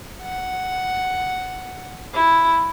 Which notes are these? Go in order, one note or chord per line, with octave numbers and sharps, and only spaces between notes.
F#5
E4